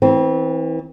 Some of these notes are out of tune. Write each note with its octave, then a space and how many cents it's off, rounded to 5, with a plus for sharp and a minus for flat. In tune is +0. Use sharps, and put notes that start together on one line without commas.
E3 -30 C4 +0